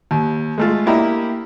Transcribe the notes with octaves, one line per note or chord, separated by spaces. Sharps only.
D#2
G#3 A3 F4
A#3 D4 E4 G4 D#5 A#5